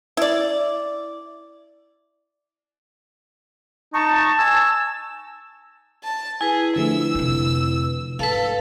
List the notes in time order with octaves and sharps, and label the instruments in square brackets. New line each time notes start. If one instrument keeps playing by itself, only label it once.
[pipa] E4 D5
[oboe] D#4 [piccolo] A5 [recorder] C#6
[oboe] G#5 [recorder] E6
[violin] A5
[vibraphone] E4 B4 [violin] G#4 [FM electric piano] G#5
[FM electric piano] D3 F3 A3 [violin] E6
[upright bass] F2 C3
[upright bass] G#2 [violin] A4 [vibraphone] B4 F5